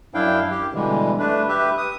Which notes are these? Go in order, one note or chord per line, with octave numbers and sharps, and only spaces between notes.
F#2 D4 E4 F5 G5
G4
B2 D3 E3 G3 G#3
A3 D4 B4
G4 B4 E5
D#6